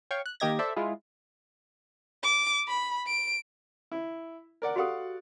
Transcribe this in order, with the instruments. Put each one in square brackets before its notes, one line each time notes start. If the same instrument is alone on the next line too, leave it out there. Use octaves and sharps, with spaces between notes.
[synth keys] C#5 F5 G5 C#6
F#6
D#3 A#3 G4 D#5 G#6 A#6
A4 C5 D5 E5
G#3 E4 F4 G#4
[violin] D6
B5
D7
[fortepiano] E4
A#4 D5 F#5
[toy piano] F#4 G4 A4 [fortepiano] D5 F5 F#5